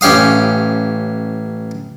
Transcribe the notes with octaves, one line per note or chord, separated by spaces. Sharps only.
A1 C#4 G4 F5 D#6